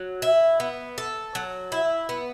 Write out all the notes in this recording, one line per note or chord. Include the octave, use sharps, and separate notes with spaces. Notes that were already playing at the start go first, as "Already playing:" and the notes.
Already playing: F#3
E4
B3
A4
F#3
E4
B3